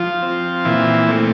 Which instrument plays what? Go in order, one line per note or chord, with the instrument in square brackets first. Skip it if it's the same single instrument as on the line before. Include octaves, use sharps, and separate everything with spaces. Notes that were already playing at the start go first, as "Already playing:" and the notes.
Already playing: [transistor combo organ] F3 F4
C4
A#2 E3 E4
A3 C4